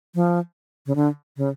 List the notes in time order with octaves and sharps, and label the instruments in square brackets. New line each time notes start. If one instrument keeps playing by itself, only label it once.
[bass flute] F3
C#3
D3
C#3